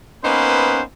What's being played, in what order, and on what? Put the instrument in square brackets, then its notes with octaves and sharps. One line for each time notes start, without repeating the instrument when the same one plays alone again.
[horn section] A#3 B3 C#4 D#4 B4 C5